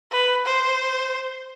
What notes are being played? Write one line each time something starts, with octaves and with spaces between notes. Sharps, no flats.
B4
C5